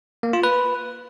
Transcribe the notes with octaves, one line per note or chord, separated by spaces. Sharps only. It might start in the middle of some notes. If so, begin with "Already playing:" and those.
A#3
F4
B4